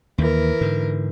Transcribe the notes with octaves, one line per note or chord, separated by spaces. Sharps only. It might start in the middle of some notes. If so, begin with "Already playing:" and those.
D#2 E3 A#4
G#2 D3